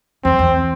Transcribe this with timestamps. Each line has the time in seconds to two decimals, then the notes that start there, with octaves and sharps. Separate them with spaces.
0.24 E2 C4
0.39 E2